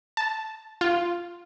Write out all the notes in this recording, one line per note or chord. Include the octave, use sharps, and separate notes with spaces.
A5
F4